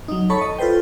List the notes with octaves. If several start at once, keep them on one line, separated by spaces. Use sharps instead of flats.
F#3 D#4
A4 C#5 A5 B5 C#6
D#5
F4 A4 B4 C5 G5